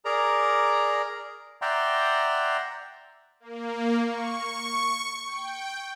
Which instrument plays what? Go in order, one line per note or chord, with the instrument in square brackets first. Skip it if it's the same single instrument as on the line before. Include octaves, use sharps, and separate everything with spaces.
[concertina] G#4 A#4 D5 A#5
D5 E5 F#5 G5 A#5 C6
[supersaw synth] A#3
C#6
G5